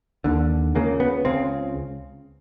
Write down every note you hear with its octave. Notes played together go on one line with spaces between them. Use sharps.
D#2 D3
C#2 C#3 A#3
B3
C#2 C#3 C4